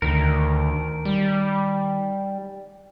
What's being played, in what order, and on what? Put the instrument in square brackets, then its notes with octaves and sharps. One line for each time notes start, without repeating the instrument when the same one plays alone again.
[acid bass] D2 [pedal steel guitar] D#3 A#4
[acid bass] G3